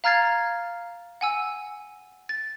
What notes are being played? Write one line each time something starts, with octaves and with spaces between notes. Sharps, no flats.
F5 A#5 F6 G#6 A6 C7
F#5 G#5 E6
A6